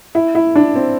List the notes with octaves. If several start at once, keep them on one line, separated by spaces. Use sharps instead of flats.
E4
E4
D4
C4